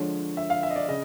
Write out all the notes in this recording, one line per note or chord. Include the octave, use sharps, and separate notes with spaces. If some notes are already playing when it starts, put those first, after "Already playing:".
Already playing: D3 F3 G#3 C#5
E5
F5
E5
D#5
D5
C#3 D#5